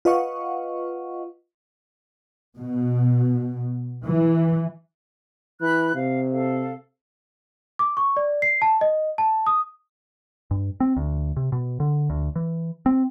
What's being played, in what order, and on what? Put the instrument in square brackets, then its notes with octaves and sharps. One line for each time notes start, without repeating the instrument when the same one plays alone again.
[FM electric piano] F4 B4 D#5 F5 F#5 C#6
[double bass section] B2
E3
[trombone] E3 [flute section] B5 F#6
[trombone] C3 [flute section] F5
[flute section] A4 F5
[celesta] D6
C#6
D5
C7
A5
D#5
A5
D#6
[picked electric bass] G2
C4
D2
C3
B2
D3
D2
E3
C4